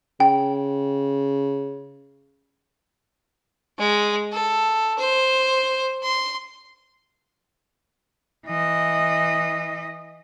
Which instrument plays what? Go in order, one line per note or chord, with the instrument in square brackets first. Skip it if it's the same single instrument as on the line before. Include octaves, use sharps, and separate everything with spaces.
[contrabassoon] C#3 [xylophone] G5
[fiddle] G#3
A4
C5
C6
[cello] E3 D#5